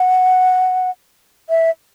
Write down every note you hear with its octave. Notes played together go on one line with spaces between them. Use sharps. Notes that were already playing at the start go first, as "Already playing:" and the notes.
Already playing: F#5
E5